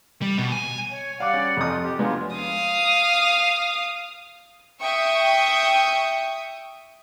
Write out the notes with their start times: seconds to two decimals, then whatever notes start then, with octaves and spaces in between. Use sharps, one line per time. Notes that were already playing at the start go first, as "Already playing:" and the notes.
0.22 G3
0.38 B2
0.52 G#5
0.92 C#5
1.20 G3 D5 F5 F#5 D6
1.34 C#4
1.57 F2 E3 D#4 F4 D#6
1.83 G4
1.99 C#3 F#3 G#3 B3 D4 F4
2.36 F5 D#6
4.80 E5 G5 C#6 D#6